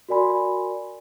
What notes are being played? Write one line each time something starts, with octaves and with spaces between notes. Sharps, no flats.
F#4 A#4 D5 G#5 B5 C6